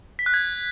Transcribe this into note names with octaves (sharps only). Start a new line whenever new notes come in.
B6
F#6
G#6